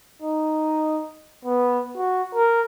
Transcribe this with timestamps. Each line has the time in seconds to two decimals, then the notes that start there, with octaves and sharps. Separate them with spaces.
0.22 D#4
1.45 B3
1.97 F#4
2.35 A#4